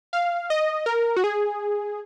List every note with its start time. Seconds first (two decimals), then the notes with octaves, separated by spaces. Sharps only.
0.13 F5
0.50 D#5
0.86 A#4
1.17 F#4
1.24 G#4